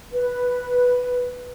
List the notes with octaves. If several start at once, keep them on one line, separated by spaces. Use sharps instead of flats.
B4